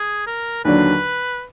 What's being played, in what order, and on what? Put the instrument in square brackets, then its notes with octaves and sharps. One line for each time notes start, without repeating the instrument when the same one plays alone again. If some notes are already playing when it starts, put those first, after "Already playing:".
Already playing: [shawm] G#4
A#4
[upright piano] D#2 D3 F#3 D4 [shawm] B4